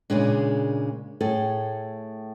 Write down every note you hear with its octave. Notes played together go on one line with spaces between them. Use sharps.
A#2 C#3 G#3 D4
A2 G#4 A4